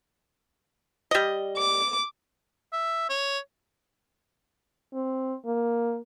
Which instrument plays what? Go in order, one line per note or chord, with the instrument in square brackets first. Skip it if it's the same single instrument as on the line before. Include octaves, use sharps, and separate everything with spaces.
[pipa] G3 D#5
[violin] D6
[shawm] E5
C#5
[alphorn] C4
A#3